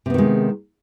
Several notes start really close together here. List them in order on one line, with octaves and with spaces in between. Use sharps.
C3 B3 D#3 G#3